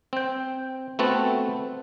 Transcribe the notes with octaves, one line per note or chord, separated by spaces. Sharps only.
C4 G5
A3 B3 C4 F#4 A4